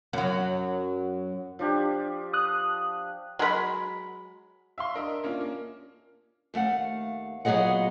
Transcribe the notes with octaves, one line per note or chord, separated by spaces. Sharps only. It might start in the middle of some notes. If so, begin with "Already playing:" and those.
F#2 F#3
F3 D4 G4
D#6 F#6
F#3 G#3 A#4 B5
E5 F5 C6
D4 A#4 D#5 E5
A#3 C#4 D4 F4
A#3
D#2 A3 F5 F#5
A#2 F#3 B3 G#4 D#5 F#5